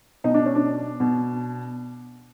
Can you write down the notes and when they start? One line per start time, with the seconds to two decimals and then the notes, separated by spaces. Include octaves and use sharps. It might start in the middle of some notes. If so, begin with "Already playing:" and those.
0.24 B2 D#4
0.34 D4
0.46 C#4
0.55 D4
1.00 B2